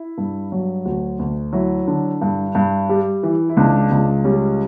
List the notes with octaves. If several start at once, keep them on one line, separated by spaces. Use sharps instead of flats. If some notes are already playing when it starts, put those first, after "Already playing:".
Already playing: E4
G2
F#3
D2 F#4
D2
F#3 E4
D3
G2
G2
G3
E3
E4
C#2 D4
C#2
G3 C#4